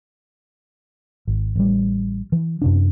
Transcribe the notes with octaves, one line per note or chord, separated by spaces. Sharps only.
G#1
A1 G3
E3
F#2 C3 D4